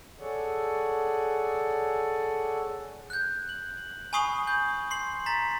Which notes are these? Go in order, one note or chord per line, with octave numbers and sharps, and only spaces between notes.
G#4 A4 C#5 D5 F#5
F#6 G6
F#7
G#5 B5 C#6 D#6 C7 F#7
G6
C6 C7 F#7
A#5 A6 B6